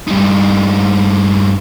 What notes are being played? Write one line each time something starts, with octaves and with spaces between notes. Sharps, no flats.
G2 D#4